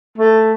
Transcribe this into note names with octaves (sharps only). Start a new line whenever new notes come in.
A3